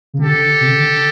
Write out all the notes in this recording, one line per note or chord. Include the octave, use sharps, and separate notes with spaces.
C#3
D3 G4 A4
C3
C#3
D3